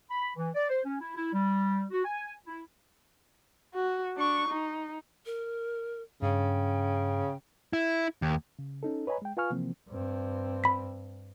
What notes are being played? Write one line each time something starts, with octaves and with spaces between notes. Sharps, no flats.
B5
E3
D5
C5
C#4
E4
E4
G3
F#4
G#5
E4
F#4
D4 C#6
D#4
A#4
G2 C#3 G5
E4
D#2
C#3
C#4 D#4 A4
B4 C#5 D#5 G#5 A#5 B5
G#3 G5
F4 B4 F5 G#5 C#6 F6
C3 E3 F3 A#3 C4
G2 C4
B5 B6